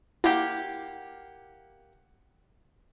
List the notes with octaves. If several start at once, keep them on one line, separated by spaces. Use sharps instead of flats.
A#3 E4 G4 F#5